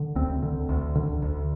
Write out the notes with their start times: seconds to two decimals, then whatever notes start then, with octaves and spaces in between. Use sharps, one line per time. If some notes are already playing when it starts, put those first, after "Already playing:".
Already playing: D3
0.15 D2 C4
0.43 D3
0.69 D2
0.95 D3
1.22 D2